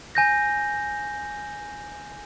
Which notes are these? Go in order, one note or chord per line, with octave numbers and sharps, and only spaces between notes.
G#5 G6 A#6